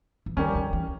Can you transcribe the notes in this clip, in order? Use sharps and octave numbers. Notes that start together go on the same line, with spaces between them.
E3
D#3 G3 C#4 G4 A#4
D#3
E3